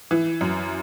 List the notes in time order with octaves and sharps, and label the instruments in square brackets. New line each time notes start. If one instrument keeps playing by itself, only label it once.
[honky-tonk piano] E3
F#2